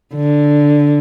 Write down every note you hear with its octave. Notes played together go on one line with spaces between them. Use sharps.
D3